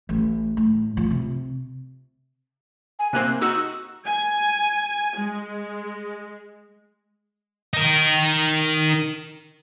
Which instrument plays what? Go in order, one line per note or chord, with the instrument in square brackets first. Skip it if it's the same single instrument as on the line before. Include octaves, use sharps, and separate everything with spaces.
[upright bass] A1
A2
F3
C3
[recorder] G#5
[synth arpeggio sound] C3 A#3 C4 [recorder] F#6
[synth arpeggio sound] D#4 F#4 [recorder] E6
[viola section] G#5
G#3
[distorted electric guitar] D#4 A#4